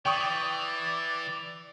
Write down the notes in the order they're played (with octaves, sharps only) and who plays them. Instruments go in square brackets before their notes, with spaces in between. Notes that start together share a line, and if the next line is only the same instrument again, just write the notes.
[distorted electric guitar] E3 [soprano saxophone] D5 [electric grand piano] G5 C#6 D#6